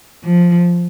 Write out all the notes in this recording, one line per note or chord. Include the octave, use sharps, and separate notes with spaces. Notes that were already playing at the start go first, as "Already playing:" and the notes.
F3